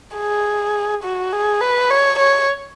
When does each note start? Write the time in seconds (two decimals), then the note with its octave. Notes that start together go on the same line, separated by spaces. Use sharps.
0.16 G#4
1.04 F#4
1.32 G#4
1.61 B4
1.90 C#5
2.19 C#5